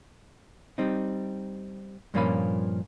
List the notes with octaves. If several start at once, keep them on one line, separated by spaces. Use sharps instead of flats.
G3 C4 D#4
G2 A#2 F3 A#3 C#4 B5